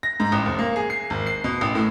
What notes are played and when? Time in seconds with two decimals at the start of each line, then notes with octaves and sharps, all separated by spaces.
0.03 A#6
0.20 G#2
0.32 A1
0.46 F1
0.59 A#3
0.76 G#4
0.90 C7
1.10 G#1
1.27 C7
1.44 B2
1.61 A1
1.75 A2